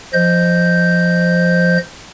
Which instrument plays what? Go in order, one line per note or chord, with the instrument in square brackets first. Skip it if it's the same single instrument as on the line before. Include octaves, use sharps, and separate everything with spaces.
[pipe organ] F3 C5 D#5 G6